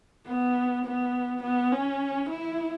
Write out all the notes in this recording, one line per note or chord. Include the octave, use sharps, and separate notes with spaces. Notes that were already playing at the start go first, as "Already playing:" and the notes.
B3
B3
B3
C#4
E4